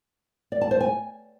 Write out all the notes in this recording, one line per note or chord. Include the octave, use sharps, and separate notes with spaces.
D5
A5
C5
G#5